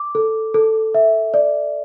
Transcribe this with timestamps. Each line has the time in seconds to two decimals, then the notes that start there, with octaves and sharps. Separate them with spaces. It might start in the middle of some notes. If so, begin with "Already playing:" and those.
Already playing: D6
0.15 A4
0.54 A4
0.95 E5
1.34 D5